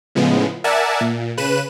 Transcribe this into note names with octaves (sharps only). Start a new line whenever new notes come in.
A2 C#3 F3 G#3 B3
A#4 D5 E5 F#5 G#5 A5
A#2
C#3 B4 F#6 D#7 E7